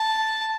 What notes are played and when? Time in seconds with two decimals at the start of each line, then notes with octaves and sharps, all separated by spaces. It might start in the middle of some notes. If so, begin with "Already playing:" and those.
Already playing: A5